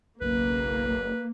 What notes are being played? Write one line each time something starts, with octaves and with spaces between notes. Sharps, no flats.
F#1 B1 A#3 B4